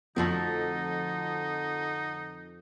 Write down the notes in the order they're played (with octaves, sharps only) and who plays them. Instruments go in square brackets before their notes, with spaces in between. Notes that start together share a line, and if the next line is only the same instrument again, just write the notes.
[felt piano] F2 [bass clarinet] D3 [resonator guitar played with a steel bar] F3 A3 F#4 [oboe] D#4